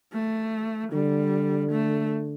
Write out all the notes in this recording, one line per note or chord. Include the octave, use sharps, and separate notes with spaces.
A3
D3 G3
A3